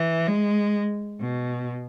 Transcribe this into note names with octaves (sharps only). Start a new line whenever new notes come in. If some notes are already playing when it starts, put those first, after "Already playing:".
Already playing: E3
G#3
B2